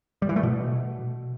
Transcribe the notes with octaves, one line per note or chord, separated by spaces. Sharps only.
G3
E3
A3
B2